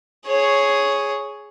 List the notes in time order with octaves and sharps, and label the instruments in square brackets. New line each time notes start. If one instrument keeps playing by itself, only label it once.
[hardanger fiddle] G#4 C#5